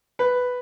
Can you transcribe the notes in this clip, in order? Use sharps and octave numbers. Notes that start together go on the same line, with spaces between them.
B4